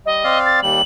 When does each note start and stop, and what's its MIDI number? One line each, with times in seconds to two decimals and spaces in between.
0.06 0.23 55
0.06 0.39 75
0.24 0.60 60
0.24 0.60 74
0.24 0.60 77
0.45 0.59 93
0.62 0.82 39
0.62 0.82 55
0.62 0.82 102